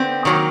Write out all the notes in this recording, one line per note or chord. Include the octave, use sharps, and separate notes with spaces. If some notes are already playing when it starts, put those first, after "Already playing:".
Already playing: D3 B3 C4
D#3 F#3 A#3